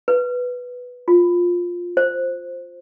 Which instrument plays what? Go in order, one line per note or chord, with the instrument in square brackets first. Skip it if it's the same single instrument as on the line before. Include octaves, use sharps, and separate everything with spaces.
[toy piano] B4
F4
C5